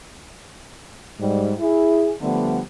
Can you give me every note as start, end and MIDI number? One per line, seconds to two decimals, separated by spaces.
1.21 1.53 44
1.21 1.53 55
1.60 2.12 64
1.60 2.12 68
2.21 2.60 50
2.21 2.60 53
2.21 2.60 55
2.21 2.60 57
2.21 2.60 59